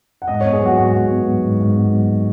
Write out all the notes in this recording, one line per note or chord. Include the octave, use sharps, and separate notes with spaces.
F#5
G#2 D#5
B3 C#5
G#4
F#3 F#4
G#2 F#4
G#2
B3
F#3
G#2
G#2
B3
F#3